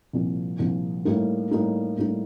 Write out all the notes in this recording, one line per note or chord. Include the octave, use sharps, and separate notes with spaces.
C2 A#2 F3
C2 A#2 F3
A2 G3 A#3 D#4
A2 G3 A#3 D#4
A2 G3 A#3 D#4